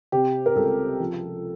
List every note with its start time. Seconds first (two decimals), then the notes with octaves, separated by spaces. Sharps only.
0.12 C3 G4
0.46 A#4
0.56 C#2 A4
1.00 F3